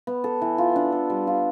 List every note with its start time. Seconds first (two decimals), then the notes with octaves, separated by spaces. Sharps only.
0.07 B3
0.24 A4
0.42 E3
0.58 F4
0.76 D4
0.92 A4
1.10 G3
1.27 F4